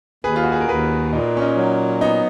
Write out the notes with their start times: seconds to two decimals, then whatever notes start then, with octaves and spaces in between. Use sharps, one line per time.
0.24 D#2 G#4 B4
0.36 F4
0.43 F#4
0.52 G#4
0.61 A#4
0.68 D#2 G#4 B4
1.12 A#2 D#4
1.37 C#4
1.41 D#4
1.56 F#3
2.01 B3 D#4